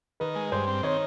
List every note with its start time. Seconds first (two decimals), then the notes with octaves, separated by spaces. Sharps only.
0.20 D#3 B4
0.36 G#3
0.52 G2 C5
0.67 C4
0.83 D#3 C#5